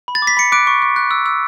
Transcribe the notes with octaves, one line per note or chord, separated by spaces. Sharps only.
B5
A6
D6
B6
B5 C#7
D6 F#6 D7
C#6
C#6
F#6
E6
E6